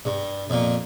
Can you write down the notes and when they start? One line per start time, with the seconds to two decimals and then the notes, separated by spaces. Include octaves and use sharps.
0.05 G2
0.50 F2 A#2